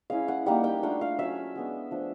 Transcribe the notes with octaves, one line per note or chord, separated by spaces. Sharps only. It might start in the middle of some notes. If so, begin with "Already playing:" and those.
G#3 C#4 E4 F5
F#5
G3 A#3 D#4 F#5
G5
A3 D4 F4 F#5
F5
F#3 A3 C#4 E5
G#3 B3 D4
F3 A3 D4